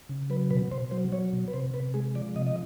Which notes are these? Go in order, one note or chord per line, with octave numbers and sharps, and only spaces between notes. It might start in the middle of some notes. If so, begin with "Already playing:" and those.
C#3
F#3 B4
B2 B4
B2 C5
F#3 C5
F#3 C#5
B2
B4
C3 C5
C3 B4
G#3 G#4
F3 D5
C3 D#5
D#5